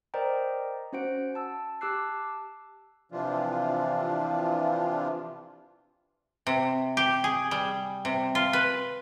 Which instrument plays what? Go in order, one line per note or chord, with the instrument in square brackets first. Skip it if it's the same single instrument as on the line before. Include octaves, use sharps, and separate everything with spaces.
[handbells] A#4 C5 D5 D#5 G5 A#5
C#4 F#4 C5 F#5 D7
A5 E6
G4 A5 D6 E6 F#6 C7
[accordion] C3 E3 F3 D4 F4
[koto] C3
G4
G#4
G3
C3
F4
B4